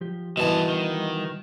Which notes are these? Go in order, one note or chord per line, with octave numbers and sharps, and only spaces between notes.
F3 G4
B2 D#3 E3 G3 B3 A5
D#3